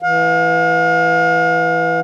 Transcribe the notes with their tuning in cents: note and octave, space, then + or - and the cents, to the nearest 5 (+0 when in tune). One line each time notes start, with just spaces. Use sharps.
E3 +0 F5 +40